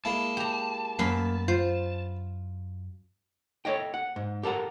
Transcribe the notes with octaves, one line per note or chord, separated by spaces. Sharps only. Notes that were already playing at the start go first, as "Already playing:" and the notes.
G#3 A#3 E4 A5
G4 A#5
F#2 A#3 B4 E5 C6
F4 C5
A4 C#5 D#5 G5
F#5
G#2
G4 A4 A#4 F#5 A#5